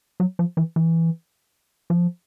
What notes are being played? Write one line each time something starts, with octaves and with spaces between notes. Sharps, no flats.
F#3
F3
E3
E3
F3